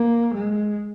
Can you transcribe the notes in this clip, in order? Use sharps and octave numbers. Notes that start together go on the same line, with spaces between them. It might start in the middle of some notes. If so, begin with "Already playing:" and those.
Already playing: A#3
G#3